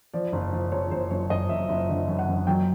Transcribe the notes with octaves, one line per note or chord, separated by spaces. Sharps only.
F3 D5
F#1
F3
F#1 C#5
F#1 C5
F#2 C#5
F#1 D#5
F#2 E5
F#1 E5
D3
F#2
F#5
F#2
F#3 G5